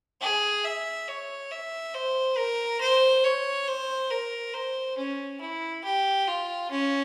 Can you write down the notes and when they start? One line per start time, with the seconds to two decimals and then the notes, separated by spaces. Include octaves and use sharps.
0.21 G#4
0.64 E5
1.08 C#5
1.51 E5
1.94 C5
2.37 A#4
2.80 C5
3.24 C#5
3.67 C5
4.10 A#4
4.53 C5
4.97 C#4
5.40 E4
5.84 G4
6.27 F4
6.70 C#4